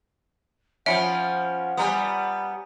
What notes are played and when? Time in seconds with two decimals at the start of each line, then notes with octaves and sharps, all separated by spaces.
0.86 F3 C#4 E5 F#5 B5 C#7 D7
1.77 G3 B3 G#5 A#5 D#6